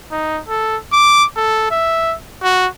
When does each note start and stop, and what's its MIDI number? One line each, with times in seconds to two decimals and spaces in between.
0.12 0.40 63
0.48 0.77 69
0.92 1.25 86
1.37 1.66 69
1.71 2.15 76
2.42 2.67 66